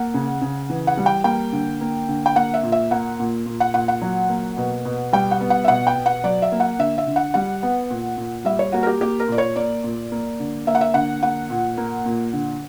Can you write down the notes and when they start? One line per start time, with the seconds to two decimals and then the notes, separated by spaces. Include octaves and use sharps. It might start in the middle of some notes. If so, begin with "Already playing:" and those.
Already playing: A#3 F#5
0.14 C#3
0.42 C#3
0.70 E3
0.87 F#5
0.97 G3
1.06 G5
1.24 A#3 G5
1.52 D3
1.81 A#3
2.09 D3
2.26 G5
2.35 A#3 F#5
2.54 E5
2.63 A#2
2.72 E5
2.91 A#3 F#5
3.19 A#2
3.46 A#2
3.60 F#5
3.74 A#2 F#5
3.88 F#5
4.02 F#3
4.29 A#3
4.57 B2
4.85 B2
5.13 G3 G5
5.31 F#5
5.41 B3
5.50 F#5
5.64 E5
5.68 B2 F#5
5.87 G5
5.96 B2
6.06 F#5
6.24 F#3 D5
6.42 E5
6.52 A#3
6.60 F#5
6.79 D3 E5
6.98 E5
7.07 D3
7.16 F#5
7.34 G3 F#5
7.63 B3
7.91 A#2
8.17 A#2
8.45 G3 E5
8.59 C#5
8.72 A#3 F#4
8.83 A#4
8.87 G4
9.01 A#3 G4
9.20 A#4
9.28 A#2 D5
9.38 C#5
9.56 A#3 D5
9.84 A#2
10.12 A#3
10.40 D3
10.67 A#3 E5
10.75 F#5
10.81 E5
10.94 D3 F#5
11.22 A#3 F#5
11.50 A#2
11.78 A#3
12.06 A#2
12.33 D3